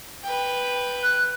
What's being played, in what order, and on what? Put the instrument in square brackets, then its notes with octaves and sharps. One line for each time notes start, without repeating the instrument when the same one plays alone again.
[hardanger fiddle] B4 G5
[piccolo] F#6